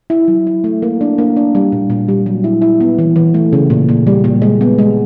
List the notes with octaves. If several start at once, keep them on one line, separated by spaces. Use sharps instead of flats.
E4
F#3
E4
A3
A#3
D4
A#3
D4
G3
A#2
A#2
G3
F#3
E4
E4
B3
E3
E3
A3
C#3
A#2
A#2
G3
A#2
G#3
B3
G#3